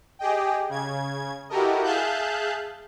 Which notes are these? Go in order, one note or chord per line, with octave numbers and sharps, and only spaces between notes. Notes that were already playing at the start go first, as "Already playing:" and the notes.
G4 G#4 D#5 G5
C#3 G#6
E4 F#4 G4 A4 A#4 D#5
G#4 E5 F5 A5 F#6 G6